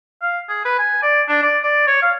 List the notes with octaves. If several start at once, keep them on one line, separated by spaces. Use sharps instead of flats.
F5
G#4
B4
G#5
D5
D4
D5
D5
C#5
F5